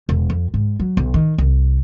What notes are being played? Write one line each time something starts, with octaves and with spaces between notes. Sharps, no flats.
E1
F2
G#2
F#3
B1
D#3
C2